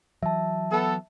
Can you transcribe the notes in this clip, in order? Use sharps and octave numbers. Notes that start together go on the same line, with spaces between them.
E3 F#3 E5 A5
B3 A4